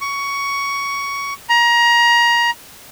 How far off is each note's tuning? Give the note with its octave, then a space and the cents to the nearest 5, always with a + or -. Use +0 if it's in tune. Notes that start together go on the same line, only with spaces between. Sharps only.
C#6 +15
A#5 +25